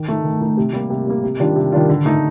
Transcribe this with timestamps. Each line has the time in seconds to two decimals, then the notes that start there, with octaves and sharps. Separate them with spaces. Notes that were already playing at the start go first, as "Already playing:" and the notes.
Already playing: D#3
0.08 A3 D#4
0.24 D#3
0.41 A3 D#4
0.57 C3
0.73 G3 A#3
0.90 C3
1.07 G3 A#3
1.23 C3
1.40 D#3 G3 D4 F4
1.56 C3
1.72 D#3 G3 D4 F4
1.89 D3
2.05 A3 D#4